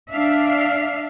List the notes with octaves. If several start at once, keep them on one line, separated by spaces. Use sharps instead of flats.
D4 E5 F5